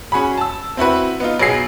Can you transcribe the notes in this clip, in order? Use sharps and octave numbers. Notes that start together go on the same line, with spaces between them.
C#4 F#4 G#4 B5
A5 E6
C4 E4 F#4 B4
B3 D#4 F4
B1 F#3 B3 G#4 E6 C7